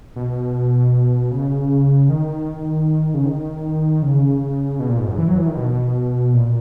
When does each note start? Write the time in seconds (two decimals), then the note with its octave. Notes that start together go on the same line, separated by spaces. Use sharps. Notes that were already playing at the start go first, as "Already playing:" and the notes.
0.16 B2
1.31 C#3
2.09 D#3
3.14 C#3
3.25 D#3
4.02 C#3
4.79 B2
4.89 A#2
4.99 G#2
5.08 F#2
5.18 E3
5.28 F#3
5.38 E3
5.48 D#3
5.57 B2
6.34 A#2